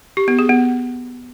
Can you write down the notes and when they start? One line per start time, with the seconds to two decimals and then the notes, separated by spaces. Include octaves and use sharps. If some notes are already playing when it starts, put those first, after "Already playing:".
0.17 G4
0.28 B3
0.39 G#4
0.49 B3